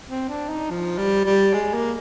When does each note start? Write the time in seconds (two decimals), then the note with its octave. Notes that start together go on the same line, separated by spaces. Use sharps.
0.08 C4
0.29 D4
0.49 D#4
0.70 F3
0.98 G3
1.25 G3
1.53 G#3
1.74 A#3